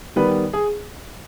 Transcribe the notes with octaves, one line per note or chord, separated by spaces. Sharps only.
D#3 G3 B3 B4
G#4